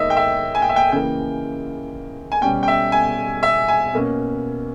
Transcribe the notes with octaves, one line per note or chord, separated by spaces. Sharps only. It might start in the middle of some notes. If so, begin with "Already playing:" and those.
Already playing: G#2 D#3 A#3 D#4 C#5 D#5 E5
G5
E5
G#5
G5
E5
G5
C#3 E3 A#3 G5
G#5
B2 G3 C#4 G5
G5
E5
G#5
E5
G#5
B2 A#3 C#4